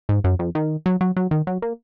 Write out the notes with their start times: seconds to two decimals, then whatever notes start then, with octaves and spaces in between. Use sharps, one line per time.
0.09 G#2
0.24 F#2
0.39 F2
0.55 D#3
0.86 F#3
1.01 F#3
1.17 F#3
1.31 D#3
1.47 F#3
1.62 A#3